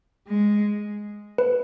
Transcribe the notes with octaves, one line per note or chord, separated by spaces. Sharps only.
G#3
B4